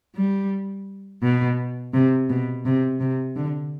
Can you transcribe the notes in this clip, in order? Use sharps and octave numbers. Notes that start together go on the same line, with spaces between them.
G3
B2
C3
B2
C3
C3
D3